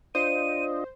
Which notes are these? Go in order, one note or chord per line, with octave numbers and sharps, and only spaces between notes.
D4 F4 C5 D#5 D#7